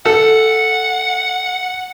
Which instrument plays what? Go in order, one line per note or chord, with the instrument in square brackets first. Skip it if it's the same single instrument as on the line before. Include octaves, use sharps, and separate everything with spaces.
[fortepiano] A4 [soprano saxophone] F#5